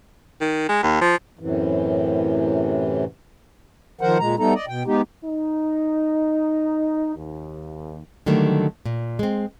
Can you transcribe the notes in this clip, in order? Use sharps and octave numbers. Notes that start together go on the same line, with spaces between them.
D#3
G#3
D#2
F3
F#2 A2 C3 E3
D#3 F3 A#4 C5 F#5
A#2 G#3 A#5
G3 A3 B3 D#4 A4 A#5
D5 D#5
B2 G5
G#3 B3 D#4 G4
D#4
D#2
D3 D#3 F#3 G3 A3 A#3
A#2
G#3 C4